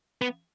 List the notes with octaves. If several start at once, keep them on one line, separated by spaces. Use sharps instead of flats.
B3